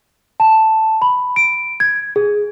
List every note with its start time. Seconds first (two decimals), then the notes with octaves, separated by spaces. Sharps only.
0.40 A5
1.02 B5
1.36 D7
1.80 G#6
2.16 G#4